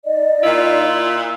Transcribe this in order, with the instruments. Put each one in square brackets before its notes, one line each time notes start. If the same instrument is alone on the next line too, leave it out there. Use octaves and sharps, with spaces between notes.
[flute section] D#4 D5 D#5
[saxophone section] A#2 E4 F4